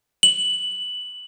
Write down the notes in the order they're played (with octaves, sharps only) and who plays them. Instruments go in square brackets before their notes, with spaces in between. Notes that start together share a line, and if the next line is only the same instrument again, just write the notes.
[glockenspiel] F#7